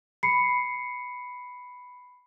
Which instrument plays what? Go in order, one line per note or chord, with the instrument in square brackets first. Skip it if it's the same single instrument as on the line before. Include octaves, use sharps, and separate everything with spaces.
[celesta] B5 C7 C#7